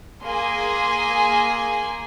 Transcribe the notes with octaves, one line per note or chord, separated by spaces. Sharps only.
A#3 G#4 G#5 C6